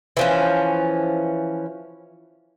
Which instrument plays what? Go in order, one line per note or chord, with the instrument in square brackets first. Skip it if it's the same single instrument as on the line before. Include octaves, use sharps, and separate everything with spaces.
[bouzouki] E3 F3 C#4